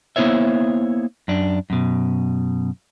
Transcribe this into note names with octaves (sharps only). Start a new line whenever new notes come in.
A#3 B3 E4 C5 C#5 E5
F#2 D4
F#2 B2